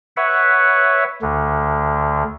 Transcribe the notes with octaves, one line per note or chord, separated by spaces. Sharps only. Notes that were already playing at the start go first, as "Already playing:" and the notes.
B4 C#5 E5 F#5
D2 D3